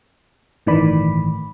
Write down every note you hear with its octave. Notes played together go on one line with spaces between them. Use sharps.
G1 A2 D#3 E3 D5 B5